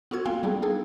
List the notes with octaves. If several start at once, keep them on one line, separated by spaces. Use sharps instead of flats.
B3 F4 F#4 A4 G#6
A#3 C4 F4 F5 G5
G3 B3 D4 G#4
D4 D#4 G#4 A4